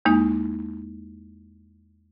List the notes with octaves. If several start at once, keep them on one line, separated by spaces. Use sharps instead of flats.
E2 G#3 A#3 D#4